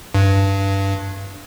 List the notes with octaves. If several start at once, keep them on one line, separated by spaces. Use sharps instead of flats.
G2